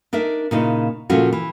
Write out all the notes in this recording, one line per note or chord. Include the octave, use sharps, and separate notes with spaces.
D4 D#4 A#4 E5
A#2 C#3 D#4 E4
A#2 C#3 F3 A3 C#4 F#4
E3